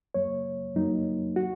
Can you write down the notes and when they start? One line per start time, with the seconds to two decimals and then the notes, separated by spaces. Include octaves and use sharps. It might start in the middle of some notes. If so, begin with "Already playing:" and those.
0.14 F#2 F#3 A#3 C#5
0.75 F#2 F#3 A#3 D#4
1.36 F#4